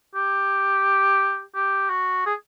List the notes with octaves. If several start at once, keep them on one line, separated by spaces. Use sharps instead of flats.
G4
G4
F#4
G#4